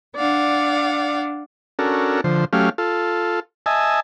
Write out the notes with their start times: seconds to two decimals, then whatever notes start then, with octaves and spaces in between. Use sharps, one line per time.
0.15 D4 D5 F5 F#5
1.79 C#4 D4 F#4 A4 A#4
2.24 D3 F3 C5
2.53 F#3 A3 C#4 G4 F5
2.78 F4 A4
3.66 D#5 E5 G#5 A5